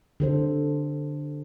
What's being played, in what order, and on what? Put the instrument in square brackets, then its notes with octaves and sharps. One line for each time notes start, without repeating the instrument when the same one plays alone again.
[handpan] D3 A4 C5